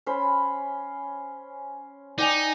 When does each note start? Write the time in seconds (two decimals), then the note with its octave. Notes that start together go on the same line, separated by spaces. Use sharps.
0.06 C#4 C5 B5
2.18 D#4 D5 G5 G#5